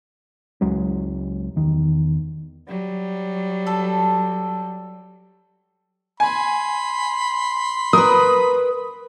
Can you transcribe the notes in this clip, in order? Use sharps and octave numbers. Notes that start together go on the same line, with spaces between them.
C#2 F#3 G#3 C#4
E2 D#3
F#3 G3
A4
G#5 B5 C6
A#4 B4 D#6